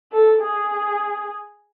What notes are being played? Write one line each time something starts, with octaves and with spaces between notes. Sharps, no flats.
A4
G#4